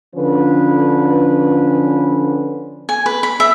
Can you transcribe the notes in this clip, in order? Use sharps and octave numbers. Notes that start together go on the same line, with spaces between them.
D3 F3 C#4 B4
G#5
B4
B5
E5